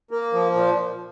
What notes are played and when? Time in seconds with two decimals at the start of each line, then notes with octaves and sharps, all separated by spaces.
0.11 A#3
0.33 F3
0.55 A#2